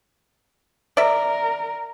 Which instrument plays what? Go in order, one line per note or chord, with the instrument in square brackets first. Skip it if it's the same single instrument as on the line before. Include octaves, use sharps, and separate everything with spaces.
[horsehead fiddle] A#4 [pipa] D5 E5